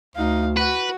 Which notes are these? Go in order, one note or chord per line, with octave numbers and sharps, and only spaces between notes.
D2 D#4 F5
F#4 B4